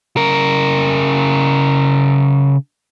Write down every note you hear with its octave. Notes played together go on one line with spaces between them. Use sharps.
C#3 A#4